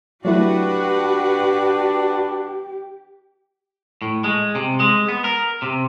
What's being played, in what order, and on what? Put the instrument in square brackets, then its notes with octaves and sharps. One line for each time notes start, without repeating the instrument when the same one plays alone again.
[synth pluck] F#3 A3 E4 [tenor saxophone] D4 [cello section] F#4 B4 [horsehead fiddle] G4
[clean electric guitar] A2
G#3
C3
G#3
B3
A#4
C3